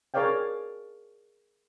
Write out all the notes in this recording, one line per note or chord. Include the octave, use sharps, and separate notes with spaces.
G#4 A#4 C#5 D5 F5 G5